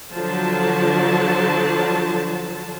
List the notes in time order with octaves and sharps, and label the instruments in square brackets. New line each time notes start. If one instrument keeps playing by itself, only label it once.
[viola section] D3 F3 F#3 A5